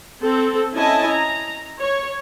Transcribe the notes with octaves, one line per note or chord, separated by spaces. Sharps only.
C4 A4
C#4 E4 D#5 G#5 A5
A#5
C#5